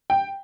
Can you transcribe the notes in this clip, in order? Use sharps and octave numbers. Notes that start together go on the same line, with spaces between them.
G5